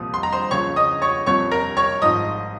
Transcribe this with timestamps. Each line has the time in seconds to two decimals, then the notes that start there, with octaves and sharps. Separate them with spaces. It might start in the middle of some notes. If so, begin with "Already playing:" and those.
Already playing: C2 A#2 F3 D#6
0.14 C6
0.23 A#5
0.32 C5 C6
0.51 C#2 C#3 F3 C#5 C#6
0.76 D#5 D#6
1.02 C#5 C#6
1.26 C2 C3 F3 C#5 C#6
1.51 A#4 A#5
1.77 C#5 C#6
2.02 G#1 G#2 F3 D#5 D#6